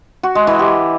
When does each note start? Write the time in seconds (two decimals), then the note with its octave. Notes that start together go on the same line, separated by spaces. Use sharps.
0.23 F#4
0.35 G#3
0.47 E3
0.59 G4